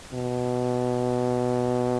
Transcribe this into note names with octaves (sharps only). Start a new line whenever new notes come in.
B2